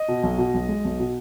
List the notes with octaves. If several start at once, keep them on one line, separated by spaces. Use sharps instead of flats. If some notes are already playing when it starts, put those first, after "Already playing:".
Already playing: D#5
B2
B1
B2
B1
G#3
B1
B2